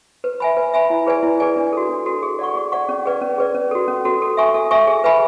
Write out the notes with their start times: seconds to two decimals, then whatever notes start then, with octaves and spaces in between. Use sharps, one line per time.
0.24 B4
0.40 E5 G#5 B5
0.57 B4
0.74 E5 G#5 B5
0.90 E4
1.07 G#4 B4 D5 G#5
1.23 E4
1.40 G#4 B4 D5 G#5
1.56 D4
1.73 F#4 A4
1.89 D4
2.06 F#4 A4
2.23 G#4
2.39 D5 F#5 C#6
2.55 G#4
2.72 D5 F#5 C#6
2.89 C#4
3.05 G#4 B4 D5
3.22 C#4
3.38 G#4 B4 D5
3.55 C#4
3.71 F#4 A4
3.88 C#4
4.05 F#4 A4
4.22 A4
4.37 E5 G#5 C#6
4.54 A4
4.71 E5 G#5 C#6
4.87 G#4
5.04 B4 E5 G#5 B5